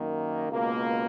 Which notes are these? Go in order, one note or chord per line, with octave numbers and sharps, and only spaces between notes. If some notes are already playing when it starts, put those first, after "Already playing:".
Already playing: F#2 D#3 A#3
C#2 B2 A#3